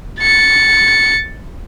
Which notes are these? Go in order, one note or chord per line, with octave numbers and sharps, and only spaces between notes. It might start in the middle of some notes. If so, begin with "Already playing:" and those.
A6 C#7